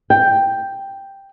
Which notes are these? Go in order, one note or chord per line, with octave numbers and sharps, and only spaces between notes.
G5